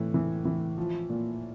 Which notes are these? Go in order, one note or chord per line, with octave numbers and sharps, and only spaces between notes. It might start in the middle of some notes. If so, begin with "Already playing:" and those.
Already playing: A2 E3
E3
E3
F3
A#2